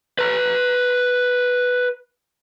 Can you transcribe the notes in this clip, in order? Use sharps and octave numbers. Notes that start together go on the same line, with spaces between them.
B4 A#5